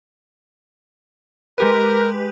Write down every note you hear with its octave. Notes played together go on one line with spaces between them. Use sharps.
G#3 G4 A#4 B4